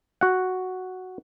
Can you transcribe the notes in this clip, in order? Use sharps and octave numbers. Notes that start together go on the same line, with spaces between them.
F#4 F#5